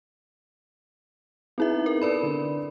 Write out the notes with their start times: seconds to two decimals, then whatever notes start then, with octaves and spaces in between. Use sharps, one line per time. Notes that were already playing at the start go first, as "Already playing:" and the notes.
1.58 B3 C4 D#4 E4 G#4 E5
1.86 A#4
2.02 A4 B4 D5 B5
2.23 D3